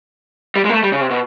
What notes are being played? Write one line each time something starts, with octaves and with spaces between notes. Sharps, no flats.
G3
G#3
A#3
A3
G3
C#3
C3
B2